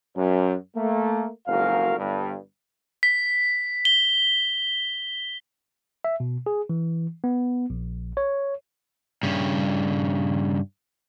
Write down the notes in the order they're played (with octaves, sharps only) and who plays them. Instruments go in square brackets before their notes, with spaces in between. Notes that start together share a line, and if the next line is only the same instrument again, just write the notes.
[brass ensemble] F#2
A3 A#3
F#1 F2 G#2 F#4 A#4 F5
G1 G2
[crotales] B6
G7
[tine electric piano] E5
B2
G#4
E3
B3
A#1
C#5
[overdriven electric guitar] G2 C#3